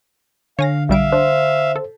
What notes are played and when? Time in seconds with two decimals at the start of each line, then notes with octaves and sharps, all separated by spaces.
0.59 D3 C#5 F5 G#5 A#6
0.89 B1 G3 E5 F5 D7
1.12 D4 C5
1.76 A4